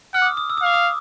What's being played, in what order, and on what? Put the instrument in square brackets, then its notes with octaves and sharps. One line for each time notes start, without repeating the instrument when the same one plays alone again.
[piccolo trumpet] F#5 [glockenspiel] F6
[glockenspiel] D6
D#6
D#6
E6
D#6
[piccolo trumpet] F5 [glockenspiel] D6
[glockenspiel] D#6